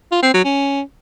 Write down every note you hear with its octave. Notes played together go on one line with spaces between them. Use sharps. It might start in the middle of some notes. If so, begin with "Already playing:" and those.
F4
C4
F#3
C#4